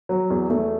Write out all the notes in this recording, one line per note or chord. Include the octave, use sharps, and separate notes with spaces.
F#3
E2
A3